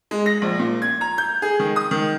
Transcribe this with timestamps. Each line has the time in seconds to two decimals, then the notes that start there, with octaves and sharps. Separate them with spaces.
0.11 G#3
0.26 A#6
0.42 A#1
0.59 A#2
0.82 G#6
1.01 A#5
1.18 G6
1.42 G#4
1.59 D#3
1.76 D#6
1.91 D#3